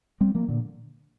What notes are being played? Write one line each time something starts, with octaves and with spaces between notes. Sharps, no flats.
G3 C4
F3 A#3
A#2 D3